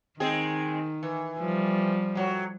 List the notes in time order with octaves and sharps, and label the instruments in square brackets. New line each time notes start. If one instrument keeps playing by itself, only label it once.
[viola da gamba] D#3 [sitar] G#3 C4 G#4
[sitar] E3
[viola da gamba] F3 G3
[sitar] A2 F#3